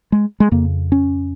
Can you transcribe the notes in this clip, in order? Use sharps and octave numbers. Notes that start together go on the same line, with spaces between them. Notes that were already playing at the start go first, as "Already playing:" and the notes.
G#3
G#3
F2 C#3 A#3
C#4